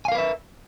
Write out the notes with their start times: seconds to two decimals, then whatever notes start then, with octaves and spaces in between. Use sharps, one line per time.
0.05 G#5
0.08 F5
0.12 A#4
0.15 B4
0.18 E5